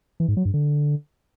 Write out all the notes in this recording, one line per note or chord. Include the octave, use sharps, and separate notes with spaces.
E3
G#2
F#3
G2
D3